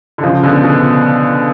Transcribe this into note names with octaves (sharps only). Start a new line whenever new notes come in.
D3
C#3 F3
B2 D3
B2